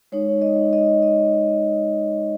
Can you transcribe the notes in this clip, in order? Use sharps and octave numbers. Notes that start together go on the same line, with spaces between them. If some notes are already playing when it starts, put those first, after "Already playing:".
G#3 D#4 C#5
D#5
D#5
D#5